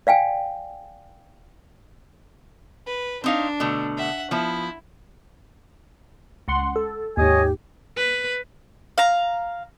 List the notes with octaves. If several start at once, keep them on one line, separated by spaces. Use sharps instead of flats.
D5 F5 G5 G#5
B4
C4 D4 D#4 F5
B2 D3 A3
E5 F#5
F3 B3 E4
C#2 F#5 C6
A4
D#2 G#2 G4 C#5 D#5 G#5
B4
F5 A#5